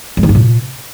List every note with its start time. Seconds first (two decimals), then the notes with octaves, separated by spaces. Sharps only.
0.17 G#3
0.23 D#3
0.29 G2
0.35 A#2